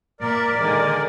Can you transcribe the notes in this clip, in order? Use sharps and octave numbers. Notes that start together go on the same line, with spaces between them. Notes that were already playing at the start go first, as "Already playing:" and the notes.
A#2 A#4 D5 E5
D3 D#3 G#3